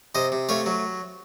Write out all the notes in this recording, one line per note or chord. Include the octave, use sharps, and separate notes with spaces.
C3 C5 D#5
C3
A3 C#5 F5
F#3